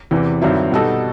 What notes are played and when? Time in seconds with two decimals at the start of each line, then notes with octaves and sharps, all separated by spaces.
0.11 E2 C3 E3
0.42 G2 D#3 F#3 C4 E4
0.72 B2 G3 D#4 F#4 A4